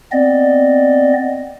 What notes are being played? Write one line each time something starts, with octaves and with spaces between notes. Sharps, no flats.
B3 C4 D5 D#5